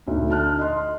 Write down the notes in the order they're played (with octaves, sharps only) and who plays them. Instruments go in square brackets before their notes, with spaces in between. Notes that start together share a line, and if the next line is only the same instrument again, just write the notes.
[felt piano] D2 D#4
A5 F6 F#6
D#5 C6